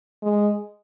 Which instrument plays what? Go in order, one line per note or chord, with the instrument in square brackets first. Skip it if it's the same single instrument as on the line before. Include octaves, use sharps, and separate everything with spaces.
[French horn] G#3